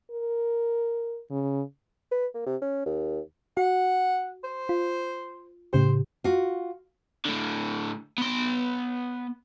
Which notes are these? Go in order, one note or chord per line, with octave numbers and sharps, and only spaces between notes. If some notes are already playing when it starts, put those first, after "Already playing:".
A#4
C#3
B4
A#3
C3
C#4
D#2
F#4 F#5
C5
F4
A2 C#3 G4 C5
F4 F#4
A2 D3
B3 C6